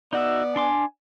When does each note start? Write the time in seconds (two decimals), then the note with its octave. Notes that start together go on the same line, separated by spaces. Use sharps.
0.13 B3 D#4 F#4 D5 E5
0.56 D4 G#5 C6 D6